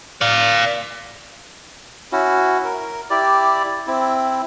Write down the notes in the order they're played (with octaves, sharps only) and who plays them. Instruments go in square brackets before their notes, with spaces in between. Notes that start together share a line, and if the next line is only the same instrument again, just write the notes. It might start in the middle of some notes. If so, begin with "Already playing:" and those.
[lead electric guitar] D5 F5
[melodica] C#4 E4 F#4
A#4
E4 G4 D5
C4 E4